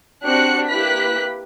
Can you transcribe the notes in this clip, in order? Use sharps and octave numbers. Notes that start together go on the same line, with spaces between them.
C4 D4 F#4 G4 F#6 C#7
A#3 E4 G4 B4 F#6 B6